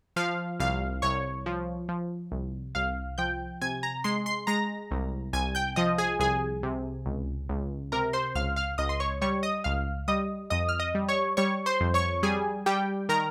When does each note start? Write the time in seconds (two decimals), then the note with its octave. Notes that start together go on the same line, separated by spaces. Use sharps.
0.16 F3 F5
0.60 C2 F5
1.02 C2 C#5 C#6
1.46 F3
1.89 F3
2.32 C2
2.75 C2 F5 F6
3.18 F3 G5 G6
3.61 C3 G#5 G#6
3.83 A#5 A#6
4.04 G#3 C6 C7
4.26 C6 C7
4.47 G#3 A#5 A#6
4.91 C2
5.33 C2 G#5 G#6
5.55 G5 G6
5.76 F3 D#5 D#6
5.98 G#4 G#5
6.19 C2 G#4 G#5
6.63 C3
7.06 C#2
7.49 C#2
7.92 C3 A#4 A#5
8.13 C5 C6
8.35 C#2 F5 F6
8.56 F5 F6
8.78 C#2 D#5 D#6
8.89 C6
9.00 C#5 C#6
9.22 G3 C#5 C#6
9.43 D#5 D#6
9.64 C#2 F5 F6
10.08 G3 D#5 D#6
10.50 F2 D#5 D#6
10.69 F6
10.79 D#5 D#6
10.95 G3
11.08 C#5 C#6
11.37 G3 C#5 C#6
11.66 C5 C6
11.81 F2
11.94 C#5 C#6
12.23 G3 G#4 G#5
12.66 G3 G4 G5
13.09 D#3 A#4 A#5